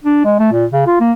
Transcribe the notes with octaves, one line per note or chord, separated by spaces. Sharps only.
D4
G#3
A3
A#2
C#3
F4
A#3